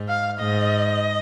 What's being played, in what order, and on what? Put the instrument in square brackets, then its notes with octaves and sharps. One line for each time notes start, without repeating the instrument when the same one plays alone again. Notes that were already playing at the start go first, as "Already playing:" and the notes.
Already playing: [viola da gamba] G#2
[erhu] F5
[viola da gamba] G#2 [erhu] D#5